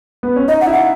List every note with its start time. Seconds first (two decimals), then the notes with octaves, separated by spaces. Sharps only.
0.23 B3
0.36 C#4
0.48 D#4 D#5
0.61 F#5
0.67 E4
0.73 F#5